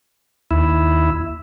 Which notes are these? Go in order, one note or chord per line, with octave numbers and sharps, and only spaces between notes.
D#2 E4